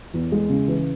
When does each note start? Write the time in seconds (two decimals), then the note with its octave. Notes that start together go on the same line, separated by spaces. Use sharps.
0.14 E2
0.32 G#3
0.50 C#3
0.68 E3